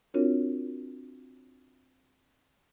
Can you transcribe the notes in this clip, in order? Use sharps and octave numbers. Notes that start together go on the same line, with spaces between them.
C4 D4 F4 F#4 A#4 C#5